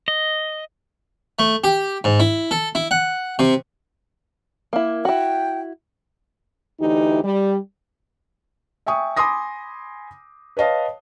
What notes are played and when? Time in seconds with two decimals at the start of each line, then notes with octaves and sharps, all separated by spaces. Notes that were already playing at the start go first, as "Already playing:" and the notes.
0.08 D#5
1.39 A3
1.64 G4
2.04 G#2
2.20 E4
2.51 A4
2.75 E4
2.91 F#5
3.39 C3
4.73 A#3 E4
5.05 E4 F#4 G5
6.79 D2 E3 D#4 G4
7.23 G3
8.86 E5 G5 G#5 C#6 D#6
9.17 G#5 B5 C6 D6 D#6 A#6
10.57 B4 C#5 D#5 F5 A5